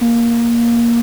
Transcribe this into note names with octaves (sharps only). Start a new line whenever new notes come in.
A#3